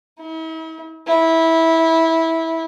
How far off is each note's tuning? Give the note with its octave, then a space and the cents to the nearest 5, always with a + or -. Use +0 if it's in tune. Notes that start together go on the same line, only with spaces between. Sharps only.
E4 -45
E4 -15